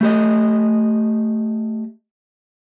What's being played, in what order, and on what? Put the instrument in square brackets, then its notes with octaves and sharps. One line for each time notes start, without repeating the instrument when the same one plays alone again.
[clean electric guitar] A3 G4 D#5